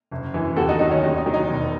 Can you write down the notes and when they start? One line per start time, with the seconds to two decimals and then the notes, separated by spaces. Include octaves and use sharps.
0.11 F#1
0.34 F#2 E3
0.56 D#2 F#4 A4
0.69 D#4 F#4
0.79 D#3 F#3 D#4
0.91 C#4
1.03 D#2 D#4
1.18 D#4
1.26 D#3 F#3
1.34 D#4
1.48 E1